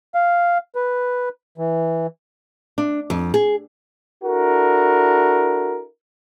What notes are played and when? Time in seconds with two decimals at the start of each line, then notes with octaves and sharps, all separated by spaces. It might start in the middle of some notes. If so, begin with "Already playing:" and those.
0.14 F5
0.75 B4
1.58 E3
2.78 D4
3.10 F2
3.34 G#4
4.24 D4 E4 F#4 A4 A#4